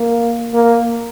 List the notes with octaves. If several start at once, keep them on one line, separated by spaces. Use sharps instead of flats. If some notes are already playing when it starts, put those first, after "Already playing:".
Already playing: A#3
A#3